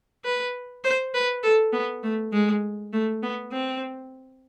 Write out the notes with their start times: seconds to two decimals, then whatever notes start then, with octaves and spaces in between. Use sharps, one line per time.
0.25 B4
0.84 C5
1.14 B4
1.43 A4
1.73 B3
2.03 A3
2.32 G#3
2.93 A3
3.23 B3
3.52 C4